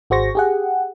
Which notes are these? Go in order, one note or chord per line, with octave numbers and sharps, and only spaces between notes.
G#1 F#4 G#4 C5 C#6 A#6
G4 G#4 F#5